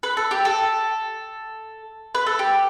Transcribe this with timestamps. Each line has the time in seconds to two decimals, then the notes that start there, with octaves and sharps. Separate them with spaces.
0.03 B4
0.17 A4
0.31 G4
0.45 A4
2.15 B4
2.26 A4
2.39 G4